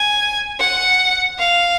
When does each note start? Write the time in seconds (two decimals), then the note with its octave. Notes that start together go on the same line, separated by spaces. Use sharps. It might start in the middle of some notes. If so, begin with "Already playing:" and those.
Already playing: G#5
0.59 F#5
1.39 F5